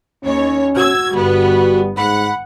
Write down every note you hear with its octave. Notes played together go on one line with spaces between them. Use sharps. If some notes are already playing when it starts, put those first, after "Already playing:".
D#2 C#4 C#5
F#4 E6 G#6
G1 G3 B3
G#2 F#5 B5